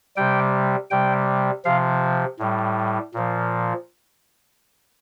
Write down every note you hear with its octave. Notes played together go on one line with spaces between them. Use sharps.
C3 G3 G5
C3 G3 G5
C3 F3 F5
A2 G3
A#2 F3